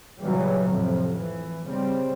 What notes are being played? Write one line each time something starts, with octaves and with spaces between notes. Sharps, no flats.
A#2 C#3 E3 F#3 G3
F2 A2 C3
E3
C#3 G3 C4